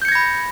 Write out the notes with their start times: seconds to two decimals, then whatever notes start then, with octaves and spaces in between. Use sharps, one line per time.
0.02 G6
0.05 C#7
0.08 G#6
0.12 A#6
0.15 B5